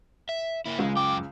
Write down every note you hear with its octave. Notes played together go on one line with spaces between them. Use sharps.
E5
A#3 E4
C#2 C#3 G#3
F#2 G5 D6